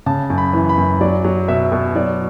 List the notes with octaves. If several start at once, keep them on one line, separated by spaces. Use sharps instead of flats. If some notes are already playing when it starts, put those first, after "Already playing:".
C#3 A5
F#2
B5
E3
B5
F#2
F#3 D5
F#3
B2 E5
B2
F#3 D5